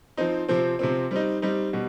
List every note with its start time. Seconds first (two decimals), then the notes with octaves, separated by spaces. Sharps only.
0.17 F3 C4 D#4
0.49 C3 F3 C4
0.79 C3 F3 C4
1.11 G3 C4 D#4
1.42 G3 C4 D#4
1.73 B2 G3